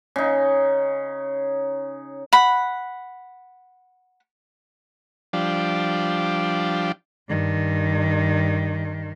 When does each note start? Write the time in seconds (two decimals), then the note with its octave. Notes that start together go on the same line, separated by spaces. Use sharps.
0.16 C#3 D#4
2.33 F#5 B5
5.33 F3 G3 D4
7.29 G2 D#3